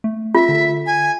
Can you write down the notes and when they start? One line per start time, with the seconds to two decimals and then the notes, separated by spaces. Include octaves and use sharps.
0.04 A3
0.35 F4 E5
0.49 D3
0.86 G#5